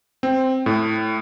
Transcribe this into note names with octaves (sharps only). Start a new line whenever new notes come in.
C4
A2